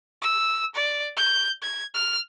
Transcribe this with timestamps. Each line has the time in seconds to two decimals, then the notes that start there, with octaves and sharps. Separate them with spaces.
0.22 E6
0.75 D5
1.17 G6
1.62 G#6
1.94 F6